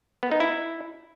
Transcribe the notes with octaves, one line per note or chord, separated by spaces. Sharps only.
B3
D#4
E4